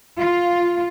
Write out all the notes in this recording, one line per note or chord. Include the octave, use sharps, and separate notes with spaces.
F4